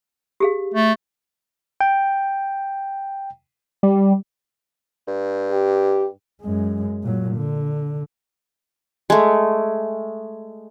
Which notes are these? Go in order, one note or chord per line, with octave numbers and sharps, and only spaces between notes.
G4 G#4 F5
A3
G5
G3
G2
G4
F#2 G#3
A#2 F#3
D3
G#3 A3